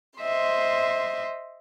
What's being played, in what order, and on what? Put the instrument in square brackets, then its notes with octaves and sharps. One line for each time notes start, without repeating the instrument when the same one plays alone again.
[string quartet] C5 D#5 E5 C6